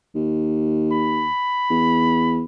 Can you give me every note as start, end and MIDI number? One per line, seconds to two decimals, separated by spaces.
0.15 1.27 39
0.92 2.45 83
1.70 2.43 40